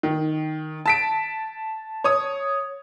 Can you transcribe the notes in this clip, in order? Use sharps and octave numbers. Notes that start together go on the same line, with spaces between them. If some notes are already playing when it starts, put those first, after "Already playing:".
D#3
A5 B6 D7
C#5 D#6